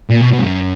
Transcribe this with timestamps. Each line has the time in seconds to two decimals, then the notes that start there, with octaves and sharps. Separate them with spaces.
0.10 A#2
0.21 B2
0.33 B2
0.39 G2
0.43 F#2